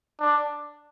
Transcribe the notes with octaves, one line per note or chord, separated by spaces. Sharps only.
D4